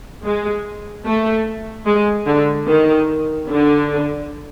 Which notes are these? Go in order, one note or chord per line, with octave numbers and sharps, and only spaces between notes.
G#3
A3
G#3
D3
D#3
D3